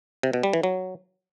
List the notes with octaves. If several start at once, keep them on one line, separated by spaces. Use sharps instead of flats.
C3
B2
G3
E3
F#3